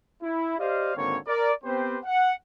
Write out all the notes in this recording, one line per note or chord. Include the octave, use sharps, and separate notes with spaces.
E4
G4 C5 D5 D#5 F5
G#1 D3 A#3 C4 C#5
A#4 D5
B3 C4 G4 B4 C5
F#5